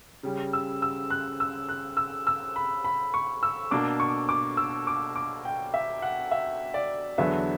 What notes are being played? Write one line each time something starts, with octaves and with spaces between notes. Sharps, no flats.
C#3 G3 C#4
E6
E6
F#6
E6
F#6
E6
E6
B5
B5
C#6
E6
B2 A#3 D4 D6
C#6
D6
E6
D6
D6
G5
E5
F#5
E5
D5
E2 D3 F#3 B3 D4 E5